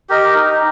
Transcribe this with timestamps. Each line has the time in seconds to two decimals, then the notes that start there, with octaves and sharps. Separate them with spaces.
0.09 G4 A#4 D#5
0.35 D#4